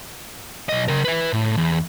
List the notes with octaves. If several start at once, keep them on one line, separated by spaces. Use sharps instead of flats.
B1 D#5
C#3 A#4
B4 E5
A2
E2